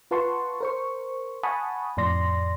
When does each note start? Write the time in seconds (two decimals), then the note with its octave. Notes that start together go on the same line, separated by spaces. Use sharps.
0.11 F4 B4 F#5 A5 C6 C#6
0.61 A#4 C5 C#6
1.43 F#5 G#5 A5 B5 C#6 D#6
1.97 F2 A2 D5 C6 A#6